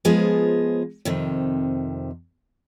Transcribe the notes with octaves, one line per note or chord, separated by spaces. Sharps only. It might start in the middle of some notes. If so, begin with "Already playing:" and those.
F3 G#3 B3 F4 G#4 C5
F2 C3 D#3